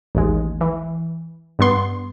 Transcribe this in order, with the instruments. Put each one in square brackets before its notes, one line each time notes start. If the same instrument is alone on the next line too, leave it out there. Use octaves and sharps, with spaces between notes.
[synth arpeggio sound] A1 D#2 G#3
E3
G2 B3 C6